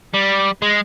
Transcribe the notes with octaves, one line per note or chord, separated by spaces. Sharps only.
G3
G#3